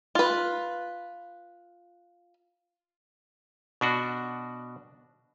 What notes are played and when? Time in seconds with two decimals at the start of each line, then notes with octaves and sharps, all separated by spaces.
0.15 F4 B4
3.81 B2 D4 F#4